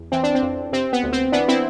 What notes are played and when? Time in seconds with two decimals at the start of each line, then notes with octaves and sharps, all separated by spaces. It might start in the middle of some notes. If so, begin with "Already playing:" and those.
Already playing: E2
0.12 E3 C4
0.23 D4
0.35 C4
0.42 F2
0.72 C3 C4
0.93 B3
1.03 D2
1.13 C4
1.32 E3 B3 D4
1.48 C4 E4